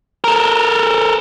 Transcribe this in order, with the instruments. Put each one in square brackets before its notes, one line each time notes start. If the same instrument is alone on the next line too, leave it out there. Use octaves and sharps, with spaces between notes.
[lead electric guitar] A4 A#4